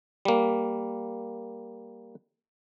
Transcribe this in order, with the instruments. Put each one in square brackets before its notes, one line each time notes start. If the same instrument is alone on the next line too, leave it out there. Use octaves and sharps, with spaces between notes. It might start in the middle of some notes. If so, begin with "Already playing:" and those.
[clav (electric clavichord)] G3 A#3